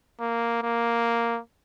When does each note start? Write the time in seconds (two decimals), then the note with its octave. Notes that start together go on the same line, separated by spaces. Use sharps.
0.20 A#3
0.62 A#3